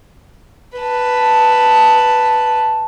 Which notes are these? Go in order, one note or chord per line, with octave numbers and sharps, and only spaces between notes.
B4 A5